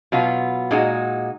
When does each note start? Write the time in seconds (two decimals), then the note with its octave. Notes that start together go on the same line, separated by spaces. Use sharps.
0.12 B2 F#3 B3 F4
0.71 A#2 G#3 D#4 F#4